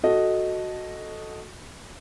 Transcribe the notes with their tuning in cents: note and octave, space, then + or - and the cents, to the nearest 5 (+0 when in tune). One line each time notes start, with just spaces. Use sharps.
F#4 +0 A4 -5 D#5 +0